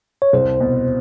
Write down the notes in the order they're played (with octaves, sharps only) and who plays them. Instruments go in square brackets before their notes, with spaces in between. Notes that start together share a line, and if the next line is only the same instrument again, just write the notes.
[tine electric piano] C#5
[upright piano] C2 [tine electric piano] C5
[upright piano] B2